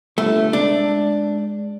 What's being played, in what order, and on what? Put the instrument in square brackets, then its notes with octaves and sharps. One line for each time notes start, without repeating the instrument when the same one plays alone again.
[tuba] G1 [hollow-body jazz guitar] A3
[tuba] G#3 [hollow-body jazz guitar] D4